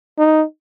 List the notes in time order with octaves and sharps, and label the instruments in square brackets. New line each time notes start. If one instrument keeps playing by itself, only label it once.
[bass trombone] D#4